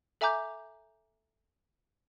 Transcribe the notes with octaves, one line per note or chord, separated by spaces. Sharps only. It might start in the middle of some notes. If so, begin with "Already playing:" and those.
A4 E5 G#5 A#5 D6 G6